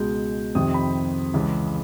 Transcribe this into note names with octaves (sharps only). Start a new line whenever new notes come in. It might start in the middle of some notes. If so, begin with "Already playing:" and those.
Already playing: C#2 B2 G#3 G6
F2 C3 D#3 D#6
B5
C#2 C#3 E3